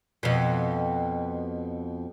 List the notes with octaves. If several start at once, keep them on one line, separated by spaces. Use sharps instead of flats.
F2 B2